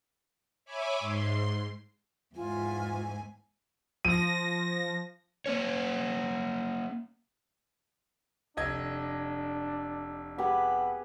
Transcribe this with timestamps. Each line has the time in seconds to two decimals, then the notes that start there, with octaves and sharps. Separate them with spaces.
0.65 C#5 E5 G#5 B5 D6
1.00 G#2 C6
2.36 E2 G#2 F4 G#5
4.05 F3 A#6 D#7
5.46 A#3 C#4 C#5
8.57 F1 D4 D#5 G#6
10.38 B3 G4 G#4 B4